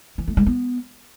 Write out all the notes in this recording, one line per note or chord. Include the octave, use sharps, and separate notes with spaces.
E3
A3
G#3
B3